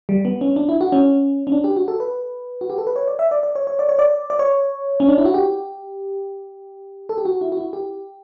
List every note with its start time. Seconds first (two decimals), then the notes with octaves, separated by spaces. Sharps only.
0.09 G3
0.25 B3
0.41 C#4
0.56 D4
0.69 E4
0.81 F#4
0.92 C#4
1.47 C#4
1.52 D4
1.64 G4
1.76 F#4
1.88 A4
2.00 B4
2.61 F#4
2.70 G4
2.78 A4
2.87 B4
2.96 C#5
3.08 D5
3.19 E5
3.31 D5
3.43 D5
3.55 C#5
3.67 C#5
3.79 D5
3.89 C#5
3.99 D5
4.30 D5
4.39 C#5
5.00 C#4
5.09 D4
5.18 E4
5.25 F#4
5.34 G4
7.09 A4
7.18 G4
7.25 F#4
7.41 E4
7.52 F#4
7.57 E4
7.73 G4